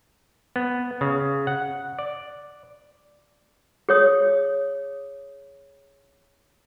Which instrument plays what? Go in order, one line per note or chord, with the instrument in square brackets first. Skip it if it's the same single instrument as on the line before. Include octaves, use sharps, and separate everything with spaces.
[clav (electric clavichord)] B3
C#3
F#5
D5
[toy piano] G#4 C#5 D#6